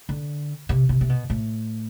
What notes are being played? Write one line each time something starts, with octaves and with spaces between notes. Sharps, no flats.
D3
C3
C3
C3
B2
A2